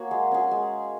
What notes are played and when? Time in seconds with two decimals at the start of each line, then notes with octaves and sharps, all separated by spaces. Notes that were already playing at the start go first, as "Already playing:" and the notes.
Already playing: A#3 F#4 G#4 C#5
0.11 G#3
0.31 C#4 G#4
0.51 G#3